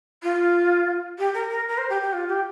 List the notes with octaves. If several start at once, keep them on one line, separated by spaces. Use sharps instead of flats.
F4
G4
A#4
A#4
A#4
C5
G4
G4
F4
G4